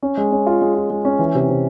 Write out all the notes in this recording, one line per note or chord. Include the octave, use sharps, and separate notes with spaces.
C#4
G#3
C#4
F4
G#3
F4
G#3
C#4
E3
C3
C3